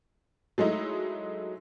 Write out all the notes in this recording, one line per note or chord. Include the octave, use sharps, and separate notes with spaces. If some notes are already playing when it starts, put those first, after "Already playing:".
F#3 G#3 A3 D#4 E4